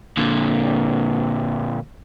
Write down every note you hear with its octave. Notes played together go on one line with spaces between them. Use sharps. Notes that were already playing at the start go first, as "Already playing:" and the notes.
A#2 D3